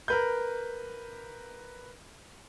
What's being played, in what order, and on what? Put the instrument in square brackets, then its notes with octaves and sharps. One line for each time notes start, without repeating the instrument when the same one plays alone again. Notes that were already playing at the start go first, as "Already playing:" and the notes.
[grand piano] A#4 B4 G6